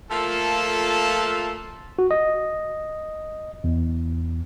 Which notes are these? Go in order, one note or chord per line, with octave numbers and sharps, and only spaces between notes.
F3 A3 A#3 F4 A4 A5
F#4
D#5
E2